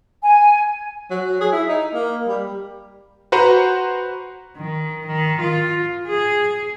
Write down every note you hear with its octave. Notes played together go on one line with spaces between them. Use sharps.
G#5
F#3
G#4
E4
D#4
A#3
G3
F#4 B4 C5 F#5 A#5
D#3
D#3
F4
G#4